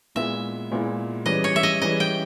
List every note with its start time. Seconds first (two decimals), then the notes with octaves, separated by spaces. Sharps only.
0.15 A#2 G#3 B3 E4 E5
0.71 A#2 G#3 B3 E4
1.26 E3 G3 C#4 G#4 B4 D#5
1.44 C#5
1.56 E5
1.63 D#5
1.82 E3 G3 C#4 G#4 B4 D#5
2.00 G5